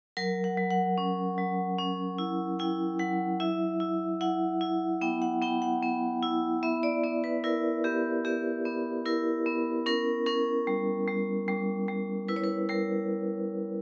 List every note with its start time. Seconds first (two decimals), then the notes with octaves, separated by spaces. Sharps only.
0.17 F#3 A#4
0.44 F#5
0.57 F#3
0.71 F#5
0.98 C#4
1.38 F#3
1.79 C#4
2.18 E4
2.59 E4 G5
2.99 F#3 F#5
3.40 E4 E5
3.80 E4
4.21 E4 F#5
4.61 E4
5.01 B3 G5
5.22 F#5
5.42 B3 G5
5.62 F#5
5.83 B3
6.23 E4
6.63 B3 E5
6.83 D5
7.03 B3 D5
7.24 B4
7.44 E4 A#4
7.84 B3 G4
8.25 B3 G4
8.65 B3
9.05 E4 A#4
9.46 B3
9.86 C#4 A#4
10.26 C#4 A#4
10.67 G3
11.08 G3
11.48 G3
11.88 G3
12.28 E4 B4
12.36 C#5
12.44 B4
12.69 G3 A#4